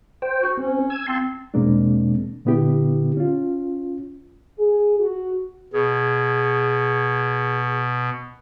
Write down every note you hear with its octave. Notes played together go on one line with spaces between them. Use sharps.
C5 G5
F#4
C4 C#4
G#5 E6 G#6
C4 A5 C6
E2 B2 G#3 A#3 C4 D4
A#2 D3 B3 E4 G4
C#4 F4
G#4
F#4
B2 G#4